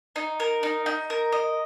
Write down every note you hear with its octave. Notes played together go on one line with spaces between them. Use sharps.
D#4
A#4
D#4
D#4
A#4
D#5